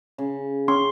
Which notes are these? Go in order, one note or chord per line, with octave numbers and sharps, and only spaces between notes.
C#3
C#4 C6